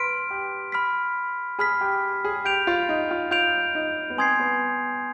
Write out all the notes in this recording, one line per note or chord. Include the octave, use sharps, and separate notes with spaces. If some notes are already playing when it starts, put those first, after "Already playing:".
Already playing: B4 C6 F6 B6 D7
G4
B5 F6 B6
G#4 B5 F6 B6
G4
G#4
G4 G6 D7 F7
F4
D#4
F4
F4 G6 D7 F7
D#4
B3
C4 G#5 C6 D#6 G#6 C7
B3